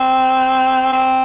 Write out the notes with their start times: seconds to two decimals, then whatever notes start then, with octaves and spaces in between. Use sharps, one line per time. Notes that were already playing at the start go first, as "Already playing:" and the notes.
Already playing: C4
0.93 C4